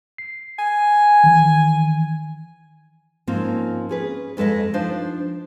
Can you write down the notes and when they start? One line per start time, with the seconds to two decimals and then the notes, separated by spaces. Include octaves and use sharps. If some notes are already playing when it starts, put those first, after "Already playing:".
0.18 C7
0.59 G#5
1.24 D#3 E3
3.27 G#2 F3 A#3 C4 C#4
3.89 C#4 G#4 B4
4.37 F2 G#3 A4 B4 D#5
4.74 F3 D4 D#4 C5